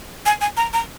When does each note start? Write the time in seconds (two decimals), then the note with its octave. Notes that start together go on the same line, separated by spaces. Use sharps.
0.26 G#5
0.41 G#5
0.57 A#5
0.73 A#5